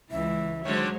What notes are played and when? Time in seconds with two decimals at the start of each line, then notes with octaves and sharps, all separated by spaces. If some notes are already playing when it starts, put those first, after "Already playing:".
0.11 C#2 E3 E5
0.65 D3 D#3 F#3 G#3 C5 C#5